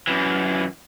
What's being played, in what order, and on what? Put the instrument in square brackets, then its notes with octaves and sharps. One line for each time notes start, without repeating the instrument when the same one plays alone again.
[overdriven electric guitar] F#2 E3